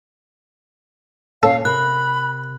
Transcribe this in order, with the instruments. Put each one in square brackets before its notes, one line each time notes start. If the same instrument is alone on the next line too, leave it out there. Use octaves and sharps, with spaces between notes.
[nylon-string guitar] A#2 C#4 C#5 [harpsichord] A4 [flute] F5
[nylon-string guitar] C3 A#4 [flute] B5 [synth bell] F#6